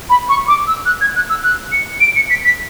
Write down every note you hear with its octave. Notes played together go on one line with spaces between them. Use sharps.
B5
C#6
D6
E6
F#6
G#6
F#6
E6
F#6
C#7
D7
C#7
B6
B6